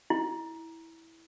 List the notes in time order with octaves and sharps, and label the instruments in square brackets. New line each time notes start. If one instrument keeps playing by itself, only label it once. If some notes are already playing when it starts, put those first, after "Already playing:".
[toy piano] E4